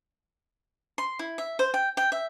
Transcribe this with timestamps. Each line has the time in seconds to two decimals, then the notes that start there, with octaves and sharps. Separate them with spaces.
0.98 C6
1.19 E4
1.38 E5
1.59 C5
1.74 G5
1.97 G5
2.12 E5